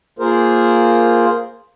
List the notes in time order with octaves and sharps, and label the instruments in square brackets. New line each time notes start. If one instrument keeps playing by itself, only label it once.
[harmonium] A#3 F4 G#4 A#4 C5